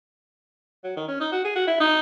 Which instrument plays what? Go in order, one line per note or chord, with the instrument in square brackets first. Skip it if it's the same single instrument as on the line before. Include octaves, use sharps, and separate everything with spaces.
[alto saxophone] F#3
D#3
C#4
D#4
F#4
G#4
F#4
E4
D#4